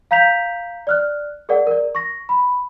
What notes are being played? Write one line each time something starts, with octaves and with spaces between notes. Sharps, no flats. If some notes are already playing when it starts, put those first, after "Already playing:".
F5 A#5 G6 B6 F7
D5 F6 F#6
G#4 A#4 D5 F#5
A#4 D5
C#6 A#6
B5